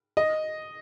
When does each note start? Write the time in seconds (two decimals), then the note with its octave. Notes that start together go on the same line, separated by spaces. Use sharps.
0.17 D#5